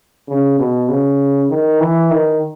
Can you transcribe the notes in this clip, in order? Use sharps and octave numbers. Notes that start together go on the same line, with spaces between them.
C#3
B2
C#3
D#3
E3
D#3